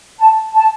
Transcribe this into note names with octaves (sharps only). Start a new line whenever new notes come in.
A5
A5